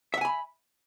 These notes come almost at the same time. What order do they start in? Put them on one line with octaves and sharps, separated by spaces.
E5 F#5 G#5 B5